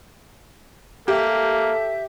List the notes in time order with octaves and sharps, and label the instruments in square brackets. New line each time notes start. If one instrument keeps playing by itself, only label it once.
[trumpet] A#3 [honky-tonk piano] G4 [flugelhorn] A4 [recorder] E5